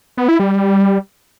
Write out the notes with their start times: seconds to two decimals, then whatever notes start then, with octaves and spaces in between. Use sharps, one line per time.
0.17 B3
0.28 E4
0.40 G3